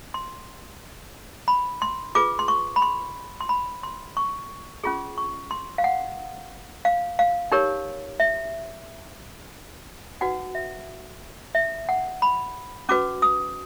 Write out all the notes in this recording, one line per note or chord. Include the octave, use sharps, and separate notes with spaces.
C6
B5
C6
F4 G#4 B4 D6
C6
C#6
B5
C6
C6
B5
C6
C#6
C#4 F4 G#4 C#6
C#6
C6
F5
F#5
F5
F5
D#4 G4 A#4 C#5
E5
D#4 F#4 B4 F#5
E5
E5
F#5
B5
C#4 F#4 B4 D6
D#6